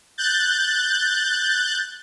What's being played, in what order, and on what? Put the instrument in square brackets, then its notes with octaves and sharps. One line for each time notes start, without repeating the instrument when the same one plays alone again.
[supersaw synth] F#6 G6 A6